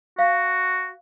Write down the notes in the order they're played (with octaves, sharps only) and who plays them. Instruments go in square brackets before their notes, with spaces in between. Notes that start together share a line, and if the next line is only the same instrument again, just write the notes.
[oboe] F#4 [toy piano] F5